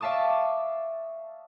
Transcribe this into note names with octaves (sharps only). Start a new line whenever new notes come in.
D5 E5 F5 A5 C#6 D#6